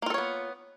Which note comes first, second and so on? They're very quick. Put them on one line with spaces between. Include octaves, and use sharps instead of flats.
A#3 F4 A4 C#5 B3